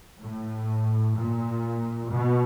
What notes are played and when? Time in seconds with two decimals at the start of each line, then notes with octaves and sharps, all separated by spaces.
0.20 A2
1.16 A#2
2.12 B2